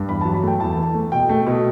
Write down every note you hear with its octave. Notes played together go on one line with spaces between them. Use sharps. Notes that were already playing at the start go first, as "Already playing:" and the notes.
Already playing: G2
E2 B5
A5
F#3
B5
A3 G5
E2 A5
E3
A3
B2 G5
A3
B2